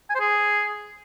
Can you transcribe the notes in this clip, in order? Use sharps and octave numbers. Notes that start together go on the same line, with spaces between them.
G#5
C5
G#4